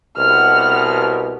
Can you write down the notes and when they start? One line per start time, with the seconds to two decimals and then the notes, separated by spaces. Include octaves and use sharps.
0.17 C2 B2 F#5 F6